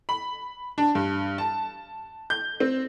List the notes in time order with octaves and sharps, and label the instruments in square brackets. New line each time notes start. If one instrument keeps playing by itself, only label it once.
[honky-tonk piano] B5
D4
G2
A5
G6
C4